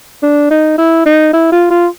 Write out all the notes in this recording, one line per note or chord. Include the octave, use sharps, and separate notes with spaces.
D4
D#4
E4
D#4
E4
F4
F4